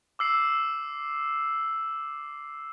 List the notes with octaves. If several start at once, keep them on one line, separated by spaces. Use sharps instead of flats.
D6 E6 C7 F#7